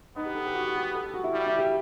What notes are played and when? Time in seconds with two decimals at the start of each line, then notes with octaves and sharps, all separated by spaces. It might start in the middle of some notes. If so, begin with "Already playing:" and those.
0.16 B3 D#4
0.25 G4
0.35 A4
0.45 G4
0.55 F#4
0.75 G4
0.95 A4
1.03 G4
1.14 F#4
1.24 E4
1.33 G3
1.47 E4
1.58 G4